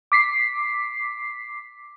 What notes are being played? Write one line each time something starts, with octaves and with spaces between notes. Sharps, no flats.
D6 B6 C7